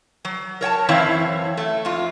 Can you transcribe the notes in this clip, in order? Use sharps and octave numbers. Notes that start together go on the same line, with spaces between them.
F#3
A#4 C#5 G5 A5
F#2 E3 C4 E4 C#5 F5
A3
F2 F4